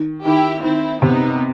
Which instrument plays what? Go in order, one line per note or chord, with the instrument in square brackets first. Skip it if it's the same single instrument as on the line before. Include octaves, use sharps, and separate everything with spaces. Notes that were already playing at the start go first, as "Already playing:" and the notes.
Already playing: [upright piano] D#3
[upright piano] D#3 [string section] E4 G4
[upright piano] D#3 [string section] C4 E4
[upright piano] C3 [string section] B3 D#4